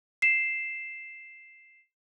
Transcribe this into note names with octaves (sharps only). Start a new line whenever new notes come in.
C7 E7